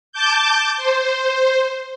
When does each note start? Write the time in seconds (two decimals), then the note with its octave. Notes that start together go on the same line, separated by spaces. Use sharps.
0.13 A5 D6 G6
0.77 C5